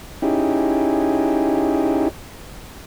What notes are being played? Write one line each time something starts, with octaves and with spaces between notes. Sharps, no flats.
C#4 D#4 E4 G4 G#4